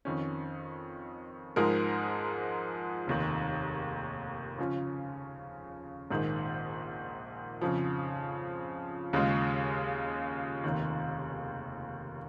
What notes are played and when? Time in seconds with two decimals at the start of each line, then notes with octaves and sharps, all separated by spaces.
0.05 F2 D#3 C#4
1.56 G#2 F3 G#3 D#4 A#4
3.07 F1 D#2 D#3
4.58 C#3 F3 C#4 F4
6.10 A#1 G#2 D#3 A#3 D#4
7.61 F2 C#3 F3
9.13 D#2 C#3 G#3 F4
10.64 F1 D#2 D#3